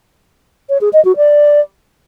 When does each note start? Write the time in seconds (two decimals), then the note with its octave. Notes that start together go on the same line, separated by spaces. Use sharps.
0.69 C#5
0.81 G#4
0.93 D#5
1.05 F#4
1.17 D5